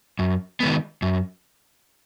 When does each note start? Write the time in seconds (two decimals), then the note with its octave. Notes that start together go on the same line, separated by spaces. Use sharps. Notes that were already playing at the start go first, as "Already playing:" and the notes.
0.19 F#2
0.60 D#3 G#3 B3
1.02 F#2